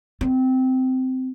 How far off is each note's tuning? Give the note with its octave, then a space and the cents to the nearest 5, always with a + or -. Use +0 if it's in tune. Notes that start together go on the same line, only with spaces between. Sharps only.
C4 -15